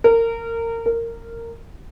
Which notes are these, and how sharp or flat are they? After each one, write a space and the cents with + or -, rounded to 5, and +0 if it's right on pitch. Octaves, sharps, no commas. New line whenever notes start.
A#4 -25
A#4 -15